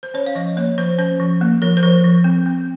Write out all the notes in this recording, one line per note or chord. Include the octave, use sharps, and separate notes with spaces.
C5
C#4 C#5
F5
F3 D#5
A#3 C#5
F3 C5
C#4 C5
F3
A#3
F3 A#4
C5
F3 A#4
F3
C4
C4